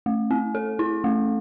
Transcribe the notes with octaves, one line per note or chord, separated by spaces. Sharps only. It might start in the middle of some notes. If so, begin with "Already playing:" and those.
A3
C4
A4
E4
A3